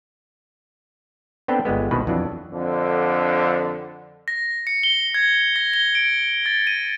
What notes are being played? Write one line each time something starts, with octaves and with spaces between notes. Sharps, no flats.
B3 C4 D4 A4 B4 G5
G1 G3 G#3 B3
C2 B2 D#3 B4
F2 E3 F#3 D4
F2 D3
A#6
C#7
G7
G#6
A#6
G7
D7
A6
D#7